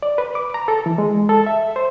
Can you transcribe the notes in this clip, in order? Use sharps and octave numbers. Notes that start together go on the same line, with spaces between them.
D5
B4
D6
A#5
A4
E3
G#3
A4
E5
C5